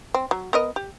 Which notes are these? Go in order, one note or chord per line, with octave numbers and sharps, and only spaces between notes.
C4
F#3
B3 A#4 D#5
G4